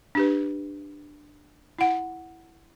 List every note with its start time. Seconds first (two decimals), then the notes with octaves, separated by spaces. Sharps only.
0.15 D4 G4 B4
1.79 E4 F#5